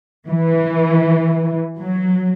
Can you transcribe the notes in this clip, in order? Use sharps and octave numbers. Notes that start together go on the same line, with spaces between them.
E3
F#3